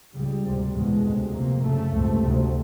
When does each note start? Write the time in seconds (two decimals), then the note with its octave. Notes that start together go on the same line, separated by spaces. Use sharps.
0.13 C#2 C#3 G3
0.43 D2 C3
0.72 E2 B2 G#3
1.02 D2 C3
1.32 F2 C3 A#3
1.61 F#2 C#3 A3
1.91 C#2 C3
2.21 D2 C3